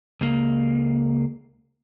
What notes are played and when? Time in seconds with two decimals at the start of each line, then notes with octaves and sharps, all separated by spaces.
0.21 C#2 A#3